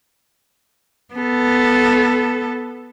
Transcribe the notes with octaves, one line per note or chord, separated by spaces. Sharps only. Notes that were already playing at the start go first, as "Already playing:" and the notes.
B3 A4